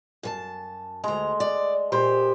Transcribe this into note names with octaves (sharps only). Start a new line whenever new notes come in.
F#2 B4 A5
D2 G#3 A#5
D5
A#2 G4 C5